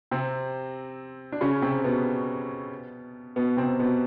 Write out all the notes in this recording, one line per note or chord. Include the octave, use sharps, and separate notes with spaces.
C3 C4
D4
C#3 C#4
C3 C4
B2 B3
B2 B3
C3 C4
B2 B3